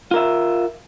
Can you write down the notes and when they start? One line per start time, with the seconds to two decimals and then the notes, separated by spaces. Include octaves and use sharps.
0.11 F4
0.14 A#4
0.16 E5